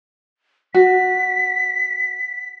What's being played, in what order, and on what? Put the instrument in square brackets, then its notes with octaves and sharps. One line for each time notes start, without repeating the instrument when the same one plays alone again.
[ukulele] F#4 [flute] B6